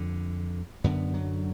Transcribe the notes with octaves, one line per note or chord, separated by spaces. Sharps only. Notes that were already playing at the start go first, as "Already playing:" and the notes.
Already playing: F2 D3
F#2 D3 B3
F#3